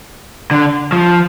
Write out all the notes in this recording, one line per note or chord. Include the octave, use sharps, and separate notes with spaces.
D3
F3